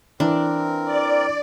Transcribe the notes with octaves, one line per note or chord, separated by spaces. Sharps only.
E3 C4 D4 A#4
D5